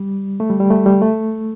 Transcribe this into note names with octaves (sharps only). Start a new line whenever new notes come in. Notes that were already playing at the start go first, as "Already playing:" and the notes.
Already playing: G3
A3
G3
G3
A3
G3
A3